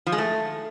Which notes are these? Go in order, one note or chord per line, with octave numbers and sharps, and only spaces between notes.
F3
G#3
A3